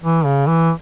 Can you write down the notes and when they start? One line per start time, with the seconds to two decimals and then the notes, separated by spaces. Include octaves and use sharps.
0.03 E3
0.25 C#3
0.47 E3